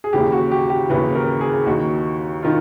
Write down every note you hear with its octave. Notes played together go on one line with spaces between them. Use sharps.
G#4
D#2 C#3 E3 G4
F#4
G4
G4
D#2 C#3 E3 B4
A#4
G#4
D#2 D#3 F#4
D#3 F4